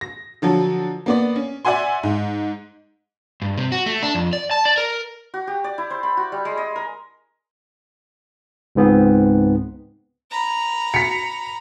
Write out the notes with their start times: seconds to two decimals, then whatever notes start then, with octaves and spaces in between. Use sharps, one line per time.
0.01 A#6
0.42 D3 F3 F#3
1.06 A#3 B3 D5
1.36 C#4
1.65 D5 E5 F#5 G#5 C6
2.03 G#2
3.42 G2
3.58 C3
3.72 F#4
3.86 A3
4.03 D4
4.15 F2
4.33 D5
4.51 A5
4.65 D5
4.78 A#4
5.34 F#4
5.47 G4
5.64 D5
5.78 E4
5.90 C5
6.03 B5
6.17 F#4
6.32 G3
6.45 G#3
6.57 D#5
6.76 A#4
8.75 C#2 G#2 B3 C4
10.31 A#5 B5
10.94 B6 C#7